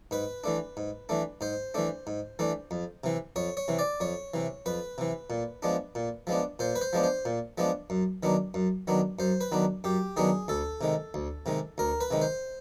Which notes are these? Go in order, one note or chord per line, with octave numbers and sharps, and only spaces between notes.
G#2 B4
E3 A3 D4
G#2
E3 A3 D4
G#2 C5
E3 A3 D4
G#2
E3 A3 D4
F2
C3 E3
F2 C#5
C#5
C3 E3
D5
F2 C#5
C3 E3
F2 B4
C3 E3
A#2
F3 G#3 B3 D4
A#2
F3 G#3 B3 D4
A#2 C5
B4
C5
F3 G#3 B3 D4
C5
A#2
F3 G#3 B3 D4
F#2
D#3 F#3 B3 D4
F#2
D#3 F#3 B3 D4
F#2 C5
B4
D#3 F#3 B3 D4
F#2 G4
D#3 F#3 B3 D4 G#4
D2 A4
C3 D#3 G#3
D2
C3 D#3 G#3
D2 A#4
B4
C3 D#3 G#3
C5